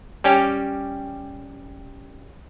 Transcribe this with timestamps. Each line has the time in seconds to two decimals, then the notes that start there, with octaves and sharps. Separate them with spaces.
0.24 G3 C#4 G4